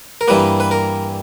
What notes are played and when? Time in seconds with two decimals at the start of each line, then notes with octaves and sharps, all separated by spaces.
0.21 A#4
0.28 G2 E3 G3 A#3 B4
0.60 B4
0.71 A#4